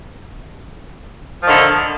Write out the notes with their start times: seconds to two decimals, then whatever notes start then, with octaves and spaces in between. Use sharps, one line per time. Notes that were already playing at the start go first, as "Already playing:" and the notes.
1.42 F3
1.46 D#3
1.50 D3